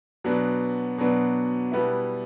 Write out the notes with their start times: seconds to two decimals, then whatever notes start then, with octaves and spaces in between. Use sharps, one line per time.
0.24 B2 F#3 B3 D4
0.98 B2 F#3 B3 D4
1.72 B2 G3 B3 E4